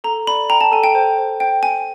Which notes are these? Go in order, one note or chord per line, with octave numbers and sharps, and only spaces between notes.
A4 A#5
D5 B5
G5 A#5
A5
A4 G#5
G5
C5
C5
C5 G5
G5 G#5